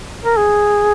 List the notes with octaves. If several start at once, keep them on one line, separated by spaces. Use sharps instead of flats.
A#4
G#4